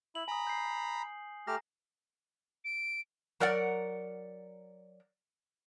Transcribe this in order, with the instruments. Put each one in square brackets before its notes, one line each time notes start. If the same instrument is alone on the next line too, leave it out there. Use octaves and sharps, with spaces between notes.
[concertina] E4 [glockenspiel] F#7
[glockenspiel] G#5 D#6 [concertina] A#5 B5
[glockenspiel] G6 C7
[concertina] A3 G4 F6 [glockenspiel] G#5 A#5 A#6
[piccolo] D7
[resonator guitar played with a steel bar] F#3 A#4 D5 F#5